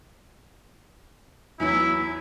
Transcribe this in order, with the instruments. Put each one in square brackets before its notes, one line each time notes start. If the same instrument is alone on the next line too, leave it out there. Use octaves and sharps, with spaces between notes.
[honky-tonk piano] E2 E3 F#3 [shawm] E4